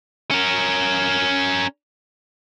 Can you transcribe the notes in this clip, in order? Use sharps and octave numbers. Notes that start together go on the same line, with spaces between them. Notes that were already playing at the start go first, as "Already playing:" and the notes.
C#4 A#4